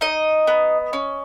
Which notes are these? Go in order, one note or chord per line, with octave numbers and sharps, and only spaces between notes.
D#4 D#5
B3
C#4